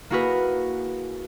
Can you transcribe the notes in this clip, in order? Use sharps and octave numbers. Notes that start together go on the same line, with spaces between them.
A#3 E4 F#4 G#4 A#4 B4